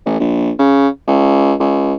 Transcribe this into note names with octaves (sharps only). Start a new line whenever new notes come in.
A1
A#1
C#3
C#2
C#2